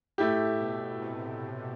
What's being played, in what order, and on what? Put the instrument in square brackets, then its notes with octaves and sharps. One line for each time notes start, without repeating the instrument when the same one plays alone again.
[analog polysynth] A2 [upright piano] A3 E4 G4
[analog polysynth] B2
C3